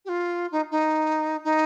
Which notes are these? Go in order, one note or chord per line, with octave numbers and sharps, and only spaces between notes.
G4
F4
D#4
D#4
D#4